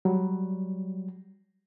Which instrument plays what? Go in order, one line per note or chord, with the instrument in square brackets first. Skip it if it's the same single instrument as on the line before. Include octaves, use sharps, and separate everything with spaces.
[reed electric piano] F#3 G3